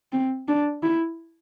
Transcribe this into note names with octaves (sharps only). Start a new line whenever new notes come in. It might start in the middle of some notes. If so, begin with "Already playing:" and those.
C4
D4
E4